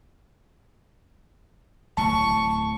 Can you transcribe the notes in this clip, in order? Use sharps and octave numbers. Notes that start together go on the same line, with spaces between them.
D1 A2 F#3 A5 C#6